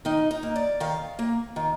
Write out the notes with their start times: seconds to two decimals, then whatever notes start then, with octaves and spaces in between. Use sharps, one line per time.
0.05 D#3 D#4
0.31 D#4
0.43 A#3
0.56 D5
0.80 D#3 F5
1.19 A#3
1.56 D#3